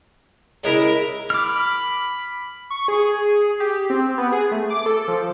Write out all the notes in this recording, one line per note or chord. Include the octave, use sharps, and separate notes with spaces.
C#3 G#3 E4 A#4
B5 D6 F6
C#6
G#4
G4
C4
B3
G#4
A3
D6
A4
F3